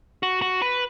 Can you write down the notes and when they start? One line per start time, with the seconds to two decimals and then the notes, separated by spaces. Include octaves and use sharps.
0.23 F#4
0.42 F#4
0.62 B4